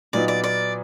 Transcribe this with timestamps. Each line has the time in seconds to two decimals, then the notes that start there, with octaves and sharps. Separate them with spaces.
0.13 A#2 F#3 B3 D#4 D5
0.28 D5
0.44 D5